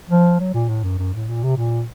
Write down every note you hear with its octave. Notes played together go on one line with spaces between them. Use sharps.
F3
F#3
A#2
A2
F#2
F#2
A2
A#2
C3
A#2